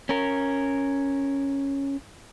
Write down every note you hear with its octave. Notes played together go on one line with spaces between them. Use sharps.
C#4 A#4